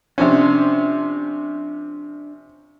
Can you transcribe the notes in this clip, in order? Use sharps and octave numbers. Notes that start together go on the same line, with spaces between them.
C3 F3 C#4 D4